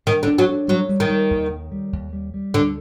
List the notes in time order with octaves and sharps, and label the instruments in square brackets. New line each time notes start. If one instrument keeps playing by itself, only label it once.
[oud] D#3 [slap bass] D4
[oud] D3
[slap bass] D4
[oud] F#3
[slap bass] D4
[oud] F#3 [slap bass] G3
[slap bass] G3
[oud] D#3
[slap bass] G3
D#2
D#3
G3
D#2
G3
G3
[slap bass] D2 [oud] D3